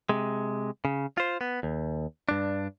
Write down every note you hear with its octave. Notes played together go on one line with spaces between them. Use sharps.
C3 G#3
C#3
F4 C5
B3
D#2
G2 D4